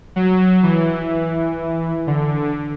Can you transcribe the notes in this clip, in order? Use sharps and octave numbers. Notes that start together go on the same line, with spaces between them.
F#3
E3
D3